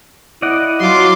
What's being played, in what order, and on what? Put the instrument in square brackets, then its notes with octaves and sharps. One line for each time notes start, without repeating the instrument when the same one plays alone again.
[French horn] E4 [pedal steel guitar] D5 D#5 F#5
[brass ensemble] F#3 F4 [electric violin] C6 D6